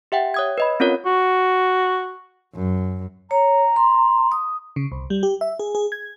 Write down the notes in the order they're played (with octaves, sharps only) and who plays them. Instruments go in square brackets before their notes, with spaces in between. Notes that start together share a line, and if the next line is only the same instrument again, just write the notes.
[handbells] G4 E5 F#5 G5
C#5 D#6 G#6
B4 D#5 B5
C4 C#4 F4 A#4 C#5
[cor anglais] F#4
[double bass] F#2
[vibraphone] C#5 [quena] A#5
[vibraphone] C6
D#6
[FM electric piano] C#3
C2
G3
G4
E5
G#4
G#4
G#6